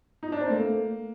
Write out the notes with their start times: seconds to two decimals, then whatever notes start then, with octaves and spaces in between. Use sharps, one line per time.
0.23 D#4
0.32 D4
0.41 C4
0.50 A3 A#3